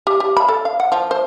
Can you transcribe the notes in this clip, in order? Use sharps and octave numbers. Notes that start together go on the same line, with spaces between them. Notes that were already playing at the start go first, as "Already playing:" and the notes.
G4
G4
B5
A4
F5
F#5
F3
C5